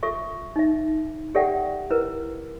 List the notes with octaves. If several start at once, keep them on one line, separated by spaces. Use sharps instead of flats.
F4 A4 E5 C#6
D#4 E5
G4 A4 D5 E5 F#5 G5
E4 A#4 B4